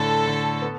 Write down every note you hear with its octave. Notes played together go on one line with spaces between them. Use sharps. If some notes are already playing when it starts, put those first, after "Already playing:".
Already playing: A2 D3 A4
D3
B3